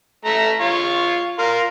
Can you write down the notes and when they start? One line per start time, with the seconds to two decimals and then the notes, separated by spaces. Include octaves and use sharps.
0.25 A3 A#5
0.60 F4 C#5
1.39 A#4 F5 C6